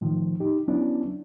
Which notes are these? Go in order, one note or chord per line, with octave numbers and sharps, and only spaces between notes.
A2 D#3 F3
D#4 G4
F#3 B3 C#4 D4 E4